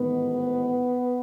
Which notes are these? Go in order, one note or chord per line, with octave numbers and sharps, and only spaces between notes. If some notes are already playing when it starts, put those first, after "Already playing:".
Already playing: A1 G#2 D#3 B3